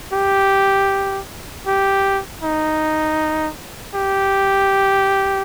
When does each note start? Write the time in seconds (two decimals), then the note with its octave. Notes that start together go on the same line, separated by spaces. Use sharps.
0.13 G4
1.67 G4
2.43 D#4
3.95 G4